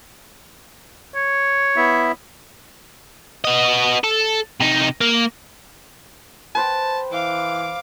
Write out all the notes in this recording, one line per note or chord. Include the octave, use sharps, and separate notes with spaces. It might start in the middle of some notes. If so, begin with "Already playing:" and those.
C#5
B3 E4 E5
B3 D#5
A4
C3 D#4
A#3
B4 C5 G5 A5
E3 F5 D6